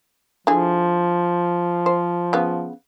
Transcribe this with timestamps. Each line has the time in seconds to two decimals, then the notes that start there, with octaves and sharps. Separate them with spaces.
0.47 D3 F3 E4 G#4
1.86 C5
2.33 C#3 B3